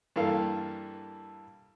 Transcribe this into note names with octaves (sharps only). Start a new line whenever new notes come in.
G2 E3 A#3 A4 F5